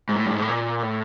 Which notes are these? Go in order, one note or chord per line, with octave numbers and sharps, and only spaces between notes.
G#2
A2
G2
G#2
A2
A#2
A2